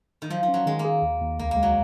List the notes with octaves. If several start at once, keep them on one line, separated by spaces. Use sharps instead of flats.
D#3
F3 F#3
F3
C#4
F#3
D#3 G#3
A#3
G#4
D#2
D#2
C#2 A#3
A#3
G#3
F#3